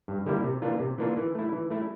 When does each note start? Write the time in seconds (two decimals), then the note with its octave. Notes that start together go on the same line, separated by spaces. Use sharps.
0.08 G2
0.26 D3 G3 A#3 E4
0.44 C3
0.62 E3 A#3 D4 F4
0.80 C3
0.98 E3 A#3 D4 F4
1.17 E3
1.35 A3 E4
1.53 E3
1.70 A3 E4